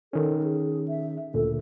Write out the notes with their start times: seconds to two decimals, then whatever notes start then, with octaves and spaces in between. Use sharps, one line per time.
0.13 D#3 C#4 A4
0.43 G#4
0.88 E5
1.34 D2 A#2 A4